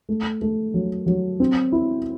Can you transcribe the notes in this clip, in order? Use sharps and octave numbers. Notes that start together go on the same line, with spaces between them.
A3
A3
F#3
F#3
C4
E4